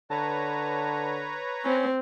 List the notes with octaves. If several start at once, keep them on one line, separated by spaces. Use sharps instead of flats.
D3 B4 C#5 A5 A#5
C4 C#4